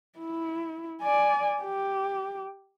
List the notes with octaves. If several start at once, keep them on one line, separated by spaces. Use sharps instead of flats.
E4
D5 G#5
G4